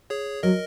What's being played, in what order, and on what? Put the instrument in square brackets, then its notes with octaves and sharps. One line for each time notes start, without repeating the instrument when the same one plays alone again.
[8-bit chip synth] G#4 C#5
[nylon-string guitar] F#3 [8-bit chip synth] A#4 D#5